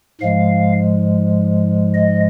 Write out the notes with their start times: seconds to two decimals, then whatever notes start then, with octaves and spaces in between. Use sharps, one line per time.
0.21 G#2 F3 G#3 F5
1.94 D#5